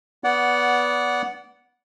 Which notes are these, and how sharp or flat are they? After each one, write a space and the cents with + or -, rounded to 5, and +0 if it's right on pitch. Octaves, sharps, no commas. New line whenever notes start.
B3 -10 D5 -25 F#5 +0